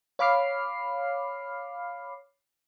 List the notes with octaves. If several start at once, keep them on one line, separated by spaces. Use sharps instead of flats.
C#5 F5 B5 D6 F6 C7